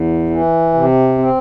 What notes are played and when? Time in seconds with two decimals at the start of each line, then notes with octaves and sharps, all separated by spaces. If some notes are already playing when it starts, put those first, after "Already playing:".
Already playing: E2
0.30 E3
0.74 C3
1.18 C4